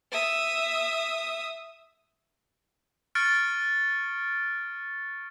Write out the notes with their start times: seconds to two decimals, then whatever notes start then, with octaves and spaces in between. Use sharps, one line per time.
0.12 E5 D#6
3.15 C#6 F6 F#6 A6 C#7 D7